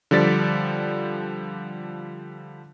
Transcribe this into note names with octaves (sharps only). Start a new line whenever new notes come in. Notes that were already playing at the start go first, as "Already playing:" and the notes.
D3 F3 G3 D5 A6 B6